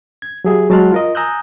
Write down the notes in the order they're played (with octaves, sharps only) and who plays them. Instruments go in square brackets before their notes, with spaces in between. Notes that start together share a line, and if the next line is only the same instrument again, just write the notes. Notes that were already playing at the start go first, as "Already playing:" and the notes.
[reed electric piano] G#6
F#3 G4 G#4 E5
F#3 G#3 A5 C6 F6 F#6
F4 A#4 D#5
G#5 A#5 D#6 E6 F#6 G6